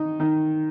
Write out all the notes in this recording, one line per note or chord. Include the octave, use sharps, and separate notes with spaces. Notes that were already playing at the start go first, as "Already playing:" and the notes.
Already playing: D#3 D#4
D#3